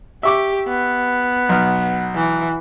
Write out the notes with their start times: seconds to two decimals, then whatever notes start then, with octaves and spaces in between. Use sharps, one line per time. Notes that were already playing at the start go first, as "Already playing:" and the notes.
0.23 G4 E5 C#6 D6
0.69 B3
1.49 B1 F6
2.15 E3